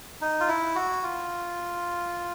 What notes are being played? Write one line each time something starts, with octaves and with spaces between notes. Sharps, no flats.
D#4
F4
E4
F#4
F4